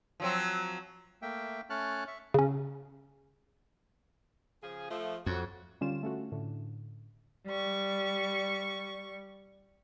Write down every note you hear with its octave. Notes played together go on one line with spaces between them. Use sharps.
F3 F#3 C4
A3 A#3 E5 G5
A3 C#4 C#5 A5 F6 F#6
E5 C#6
C#3 C#4
C#3 F3 G#4
F3 A3
F2 F#3 F#4
D3 G3 C#4 F4 E7
A3 C#4 F#4
A2 D3
G3 C#6